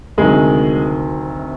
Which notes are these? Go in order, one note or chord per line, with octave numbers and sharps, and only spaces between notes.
D2 C3 D#3 F#3 G#3 G#4